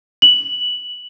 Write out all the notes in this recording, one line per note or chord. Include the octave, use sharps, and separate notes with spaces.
F#7